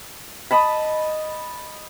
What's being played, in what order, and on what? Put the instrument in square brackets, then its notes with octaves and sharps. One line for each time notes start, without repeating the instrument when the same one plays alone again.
[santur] D#5 A5 B5